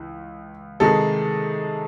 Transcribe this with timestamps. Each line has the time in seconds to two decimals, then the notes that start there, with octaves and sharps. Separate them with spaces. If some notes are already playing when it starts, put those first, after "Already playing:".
Already playing: C#2 E3
0.80 C3 D#3 G#3 D#4 A4